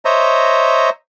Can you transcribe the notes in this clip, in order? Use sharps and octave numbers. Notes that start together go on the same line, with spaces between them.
C5 C#5 D#5 E5 A#5